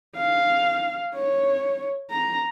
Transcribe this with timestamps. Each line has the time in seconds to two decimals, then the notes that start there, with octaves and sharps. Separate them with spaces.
0.16 F5
1.14 C#5
2.10 A#5